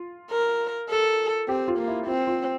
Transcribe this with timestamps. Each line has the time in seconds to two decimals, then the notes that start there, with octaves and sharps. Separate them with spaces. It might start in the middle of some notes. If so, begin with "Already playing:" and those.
Already playing: F4
0.31 A#4
0.90 A4
1.48 C4 G4
1.68 F4
1.78 A#3
1.88 E4
2.07 C4 F4
2.27 F4